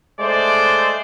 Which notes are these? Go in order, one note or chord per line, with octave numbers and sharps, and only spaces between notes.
G#3 A3 C5 D5